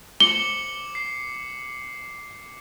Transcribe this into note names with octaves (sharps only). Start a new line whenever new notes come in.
D6 C#7 F#7 G7
C7